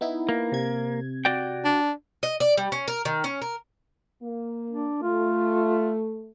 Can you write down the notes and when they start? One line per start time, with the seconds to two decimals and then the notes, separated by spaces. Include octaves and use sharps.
0.01 B3 D#4 E4
0.29 A#3
0.52 C3 G#6
1.25 F#4 D5 G5
1.65 D4
2.23 D#5
2.40 D5
2.57 G3
2.72 C#4
2.88 A#4
3.05 D#3
3.24 C#4
3.42 A#4
4.23 A#3
4.70 D4
5.02 A3 F4